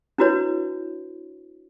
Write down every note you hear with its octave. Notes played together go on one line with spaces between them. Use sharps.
D4 E4 F#4 B4 C#5